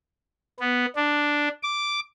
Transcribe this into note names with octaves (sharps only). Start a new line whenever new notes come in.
B3
D4
D6